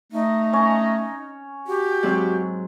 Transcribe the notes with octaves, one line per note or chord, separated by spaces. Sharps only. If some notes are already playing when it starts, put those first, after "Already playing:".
A3 D#4
C#4 C#5
F#4 G4
G#2 F#3 C4